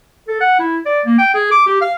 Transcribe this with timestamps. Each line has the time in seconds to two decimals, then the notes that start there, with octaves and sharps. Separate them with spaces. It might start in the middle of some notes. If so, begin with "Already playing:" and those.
0.28 A4
0.41 F#5
0.59 E4
0.85 D5
1.05 A#3
1.18 G5
1.34 G#4
1.51 D6
1.67 G4
1.81 F5